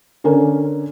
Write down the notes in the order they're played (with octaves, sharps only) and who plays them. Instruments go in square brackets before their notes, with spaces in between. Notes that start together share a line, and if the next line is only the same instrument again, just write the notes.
[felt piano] D3 C#4 A#4